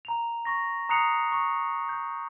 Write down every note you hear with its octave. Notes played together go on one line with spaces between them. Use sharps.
A#5 F7
C#6 A#6
A#5 D#6 F#6 C7 C#7 F7
C#6
G6